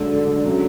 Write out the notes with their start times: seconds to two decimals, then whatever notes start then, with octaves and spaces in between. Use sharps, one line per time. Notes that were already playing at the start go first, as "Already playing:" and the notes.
Already playing: G#2 D3 F#3 A3
0.46 C#3 F#3 A3